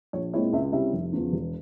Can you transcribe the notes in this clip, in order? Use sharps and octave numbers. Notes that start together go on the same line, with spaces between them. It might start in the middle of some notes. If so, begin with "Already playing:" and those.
A#1 C#5
A#2 G#3 C4 E4 C#5
C#2 E5
C3 G3 C#4 E4 E5
F1
E2 C#3 F3
E1